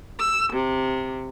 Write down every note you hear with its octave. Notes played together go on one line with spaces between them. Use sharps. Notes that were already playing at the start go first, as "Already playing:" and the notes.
E6
C3